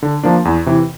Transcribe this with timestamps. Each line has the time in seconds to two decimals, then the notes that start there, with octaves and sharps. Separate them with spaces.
0.02 D3
0.23 F3 A#3 D4
0.45 E2
0.66 C3 E3